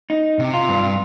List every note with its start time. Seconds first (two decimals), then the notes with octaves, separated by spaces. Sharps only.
0.10 D#4
0.39 C3
0.54 F4
0.68 G2